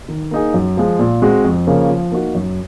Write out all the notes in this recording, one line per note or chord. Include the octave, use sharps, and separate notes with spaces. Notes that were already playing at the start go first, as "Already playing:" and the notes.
D#3
A#3 D#4 G#4
F#2
F3 G#3
A#2
G#3 C4 F#4
F2
C#3 F3 A#3 C#4
F3
A#3 D#4 F#4
F#2